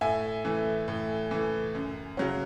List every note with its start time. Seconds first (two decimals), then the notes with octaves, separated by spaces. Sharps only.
0.01 A2 E5 G#5
0.45 E3 A3
0.88 A2
1.31 E3 A3
1.75 F#2
2.17 C#3 F#3 C#4